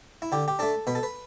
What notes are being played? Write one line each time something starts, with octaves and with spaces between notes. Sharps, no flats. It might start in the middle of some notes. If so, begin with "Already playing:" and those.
E4
D3 G4
G4
A3 D4 A4
B2 B4
A4
B4